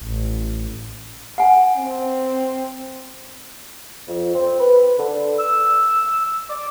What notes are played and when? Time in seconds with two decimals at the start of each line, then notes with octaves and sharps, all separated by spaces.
0.02 A1
1.38 F#5 G#5
1.77 C4
4.08 F2
4.35 C4
4.60 B4
4.99 D3
5.39 E6
6.50 D6